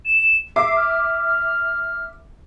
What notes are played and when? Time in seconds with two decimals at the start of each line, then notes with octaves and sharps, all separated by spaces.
0.05 E7
0.56 E5 D6 C7
0.76 F6